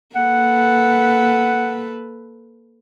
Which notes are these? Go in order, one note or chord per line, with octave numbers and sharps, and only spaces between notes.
A#3 A4 B4 F#5